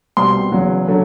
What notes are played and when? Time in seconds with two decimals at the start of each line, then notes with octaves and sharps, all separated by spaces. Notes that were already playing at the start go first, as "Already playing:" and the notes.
0.17 C2 B2 G3 C4 C6
0.51 E2 C#3 F#3
0.87 D3 F#3 A3